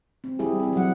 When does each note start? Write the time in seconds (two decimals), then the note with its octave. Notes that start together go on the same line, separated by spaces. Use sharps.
0.24 C4
0.39 G3 E4 G4 G#4
0.60 C4 G#4
0.73 F#3 C4 F#5